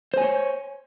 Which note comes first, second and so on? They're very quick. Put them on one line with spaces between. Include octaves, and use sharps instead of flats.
C5 G#5 C#5